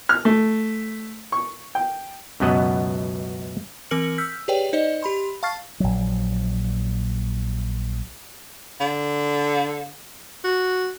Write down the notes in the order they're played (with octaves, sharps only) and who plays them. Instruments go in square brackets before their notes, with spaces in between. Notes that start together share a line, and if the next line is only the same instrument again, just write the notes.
[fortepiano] F6
A3
C#6
G5
[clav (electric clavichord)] C#2 F#2 B2 B3 D#5 F#5
[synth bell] E3 C4 A#4 F6 C#7 F#7
E6 F6 G6 B6
G4 G#4 B4 C#5 D5 G5
D#4 C5 D5 D#5
G4 B5 C6
F5 A5 C#6 F6 A6 C7
[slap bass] A#1 F#3
[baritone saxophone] D3
F#4